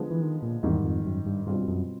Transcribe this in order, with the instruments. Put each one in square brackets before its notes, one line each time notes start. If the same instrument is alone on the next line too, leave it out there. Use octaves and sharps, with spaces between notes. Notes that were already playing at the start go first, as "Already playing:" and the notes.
Already playing: [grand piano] D3 F3 G#3 B3
[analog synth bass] E3
D#3
A#2
[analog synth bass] E2 [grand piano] G#2 D#3 G3
[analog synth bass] F2
F#2
G2
[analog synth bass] G2 [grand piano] B2 G3 C4 F4
[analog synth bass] F#2